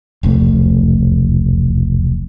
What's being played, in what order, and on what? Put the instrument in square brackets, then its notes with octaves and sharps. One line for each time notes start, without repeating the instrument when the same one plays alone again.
[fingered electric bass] E1 C2 F2 A3